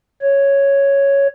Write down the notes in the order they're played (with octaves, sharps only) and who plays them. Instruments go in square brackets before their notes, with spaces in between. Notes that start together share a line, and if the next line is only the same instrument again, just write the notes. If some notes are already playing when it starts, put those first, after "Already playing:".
[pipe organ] C#5